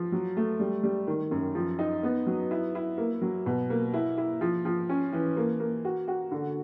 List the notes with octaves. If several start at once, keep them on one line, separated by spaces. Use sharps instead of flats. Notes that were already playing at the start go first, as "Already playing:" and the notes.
Already playing: F3
F#3
A3
G3
G3
D#3
F#2
F3
D#4
B3
F#3
E4
E4
A#3
F#3
B2
A#3
E4
E4
F3
F3
C#4
E3
A#3
A#3
F#4
F#4
D3